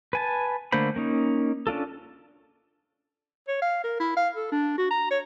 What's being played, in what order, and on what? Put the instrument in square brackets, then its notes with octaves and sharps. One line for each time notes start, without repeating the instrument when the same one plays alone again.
[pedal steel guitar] B4 G#5 A5
D3 A3 A#3 C5 B5
A#3 C#4 D#4
C#4 D4 F4 A4
[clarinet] C#5
F5
A#4
E4
F5
A4
D4
F#4
A#5
C#5